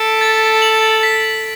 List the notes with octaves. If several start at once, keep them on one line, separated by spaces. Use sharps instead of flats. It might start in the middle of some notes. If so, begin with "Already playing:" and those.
Already playing: A4 B6 D7
A6
F#7
B6